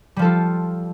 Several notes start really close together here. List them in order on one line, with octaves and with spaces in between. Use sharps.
G3 F3 A4 F4